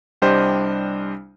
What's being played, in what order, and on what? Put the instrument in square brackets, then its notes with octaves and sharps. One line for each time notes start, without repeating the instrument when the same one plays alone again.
[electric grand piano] C2 G3 D4 G4 C5 D#5